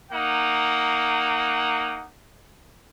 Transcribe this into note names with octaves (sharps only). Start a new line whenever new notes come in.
A#3 D#4 F#5